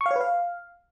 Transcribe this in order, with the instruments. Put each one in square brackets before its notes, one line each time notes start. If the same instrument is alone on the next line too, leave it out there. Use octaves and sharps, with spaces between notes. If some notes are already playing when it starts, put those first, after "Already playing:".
[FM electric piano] C#6
F5
C#5
B4
F5